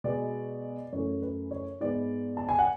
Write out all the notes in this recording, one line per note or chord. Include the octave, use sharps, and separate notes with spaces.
B2 G#3 B3 D5
F#2 E3 A3 C#5
B4
C#5
G#2 G#3 B3 D5
A5
G#5
F#5